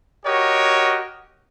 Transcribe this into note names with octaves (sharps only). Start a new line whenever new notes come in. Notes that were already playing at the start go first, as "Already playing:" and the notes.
F#4 G4 A#4 C#5 D#5